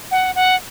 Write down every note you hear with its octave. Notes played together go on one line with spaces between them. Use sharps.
F#5
F#5